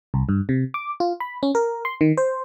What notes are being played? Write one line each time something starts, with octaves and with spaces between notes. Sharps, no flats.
C2
G2
C3
D6
F4
B5
C#4
A#4
C6
D#3
C5